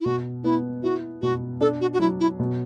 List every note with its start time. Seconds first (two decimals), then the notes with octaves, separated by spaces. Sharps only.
0.01 E4
0.05 B2 F#4
0.44 B3 E4
0.83 E4 F#4
1.22 B2 F#4
1.61 D4 A4
1.81 F#4
1.93 F#4
2.00 F#3 E4
2.20 E4
2.40 B2